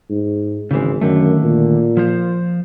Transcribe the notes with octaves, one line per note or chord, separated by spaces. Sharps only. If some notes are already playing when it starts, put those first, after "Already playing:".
G#2
G#1 C#3 E3 G#3
F#2 D3 D#3 A3
A#2
F3 F4 C5